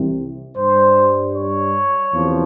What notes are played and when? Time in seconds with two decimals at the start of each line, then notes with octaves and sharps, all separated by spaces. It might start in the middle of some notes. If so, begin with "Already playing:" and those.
Already playing: C2 C3 E3
0.57 G2 G3 C5
1.34 C#5
2.11 E2 C3 F3